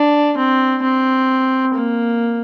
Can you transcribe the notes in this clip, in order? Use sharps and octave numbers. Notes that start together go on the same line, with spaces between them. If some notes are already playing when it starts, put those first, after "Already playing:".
Already playing: D4
C4
C4
A#3